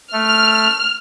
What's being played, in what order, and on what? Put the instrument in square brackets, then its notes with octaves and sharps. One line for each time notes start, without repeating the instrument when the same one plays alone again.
[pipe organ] A3 [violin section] F6